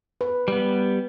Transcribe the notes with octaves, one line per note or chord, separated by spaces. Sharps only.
B4
G3 B3